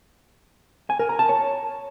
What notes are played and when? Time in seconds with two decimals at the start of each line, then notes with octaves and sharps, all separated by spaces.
0.90 G#5
0.99 A#4
1.09 A#5
1.19 A5
1.29 C#5